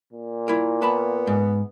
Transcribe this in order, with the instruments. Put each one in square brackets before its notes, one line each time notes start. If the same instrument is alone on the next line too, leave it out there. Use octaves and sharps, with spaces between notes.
[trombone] A#2
[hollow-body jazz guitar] E4 A#4
[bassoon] B3 [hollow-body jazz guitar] B4 A5 B5
[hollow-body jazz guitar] G#2